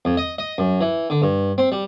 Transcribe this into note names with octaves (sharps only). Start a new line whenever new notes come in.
F2
D#5
D#5
F#2
E3
D3
G2
C4
G3